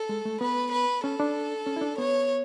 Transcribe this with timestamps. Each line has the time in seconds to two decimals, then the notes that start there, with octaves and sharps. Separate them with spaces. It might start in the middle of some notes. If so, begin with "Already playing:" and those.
Already playing: A4
0.09 G#3
0.25 A3
0.41 B3 B4
0.72 B4
1.04 C#4 A4
1.20 D4
1.66 C#4
1.76 E4
1.81 D4
1.98 B3 C#5